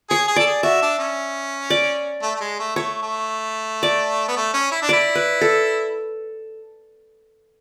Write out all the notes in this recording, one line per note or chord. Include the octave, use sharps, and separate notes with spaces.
G#4 C#5
G#4
A4 D5
G#4
F#4 E5
D4
C#4
D5
A3
A3
G#3
A3
A3 C#5
A3
D5
B3
A3
C#4
E4
D4
E4 D5
B4
A4